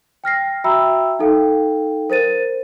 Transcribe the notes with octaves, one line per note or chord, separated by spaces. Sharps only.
G5 F6 A#6 C7
F#4 E5 G5 A#5 B5 E6
D#4 A4 F5 G5
A#4 C5 A6 D#7